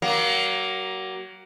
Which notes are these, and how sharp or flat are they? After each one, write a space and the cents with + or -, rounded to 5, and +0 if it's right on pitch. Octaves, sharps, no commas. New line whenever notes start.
F#3 +30 A#3 +10